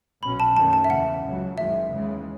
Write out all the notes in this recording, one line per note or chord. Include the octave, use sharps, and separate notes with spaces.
B1 B2 F#3 C#4 B5
A5
F#2 D#3 A3 C#4 A5
A5
E5
E2 C#3 E3 F#5
C#2 C#3 F#3
F#1 F#2 D#3 G#3 E5
D#2 C#3 E3 G#3